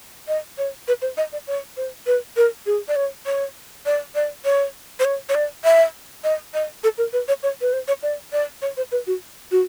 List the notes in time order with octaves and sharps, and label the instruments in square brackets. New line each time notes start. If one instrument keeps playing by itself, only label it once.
[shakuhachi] D#5
C#5
B4
C5
D#5
D5
C#5
C5
B4
A#4
G#4
D5
C#5
C#5
D5
D5
C#5
C5
C#5
C#5
D5
E5
D#5
D#5
A4
A#4
B4
C#5
C#5
B4
C5
C#5
D5
D5
C#5
C5
B4
F#4
F#4